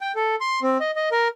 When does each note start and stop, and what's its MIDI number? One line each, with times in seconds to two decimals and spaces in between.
0.01 0.12 79
0.15 0.35 69
0.41 0.60 84
0.62 0.78 60
0.80 0.91 75
0.96 1.09 75
1.12 1.28 70